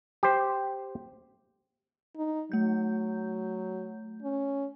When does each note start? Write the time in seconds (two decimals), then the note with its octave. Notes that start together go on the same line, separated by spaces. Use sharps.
0.23 G4 C5
2.16 D#4
2.52 F#3 A3 G6
4.22 C#4